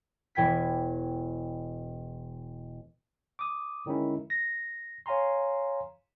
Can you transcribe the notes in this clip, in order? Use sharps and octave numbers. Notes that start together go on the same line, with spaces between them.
E1 E3 G5 G#6 B6
D6 D#6
D3 D#3 G#3 C#4 E4
A#6
C#5 F5 G#5 A#5 C6